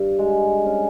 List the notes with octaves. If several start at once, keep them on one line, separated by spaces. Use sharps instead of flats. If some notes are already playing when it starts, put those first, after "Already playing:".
Already playing: G2
G#3
C#4